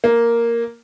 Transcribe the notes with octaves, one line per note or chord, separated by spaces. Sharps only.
A#3